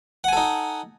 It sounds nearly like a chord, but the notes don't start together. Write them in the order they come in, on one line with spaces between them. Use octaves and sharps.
F#5 G#5 A4 D#4